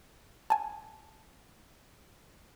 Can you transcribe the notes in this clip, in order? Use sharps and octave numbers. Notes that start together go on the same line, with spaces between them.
G#5 A5